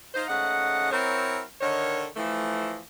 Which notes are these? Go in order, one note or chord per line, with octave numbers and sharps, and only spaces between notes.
D#4 F4 C5
G#2 C#3 A3 D#5 F#5
F#3 C4 E4 A#4 C5 C#5
D3 D#3 C#5
E3 F3 A3